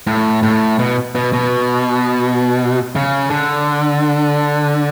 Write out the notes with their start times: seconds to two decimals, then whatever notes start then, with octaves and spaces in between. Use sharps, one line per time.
0.07 A2
0.43 A2
0.79 B2
1.15 B2
1.33 B2
2.96 C#3
3.30 D3